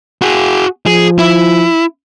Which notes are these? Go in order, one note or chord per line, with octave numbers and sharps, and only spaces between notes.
F#4 G#4
F3 G#4
E4